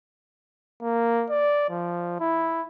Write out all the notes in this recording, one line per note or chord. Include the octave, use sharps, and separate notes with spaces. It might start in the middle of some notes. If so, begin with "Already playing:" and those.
A#3
D5
F3
E4